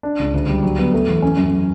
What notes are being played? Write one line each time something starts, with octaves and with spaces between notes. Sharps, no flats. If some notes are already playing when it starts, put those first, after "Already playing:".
D4
C#2
D2
G3
F#3
B3
A3
E2
C#4
F#2